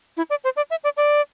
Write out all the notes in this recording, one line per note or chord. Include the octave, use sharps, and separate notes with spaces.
E4
D5
C5
D5
E5
D5
D5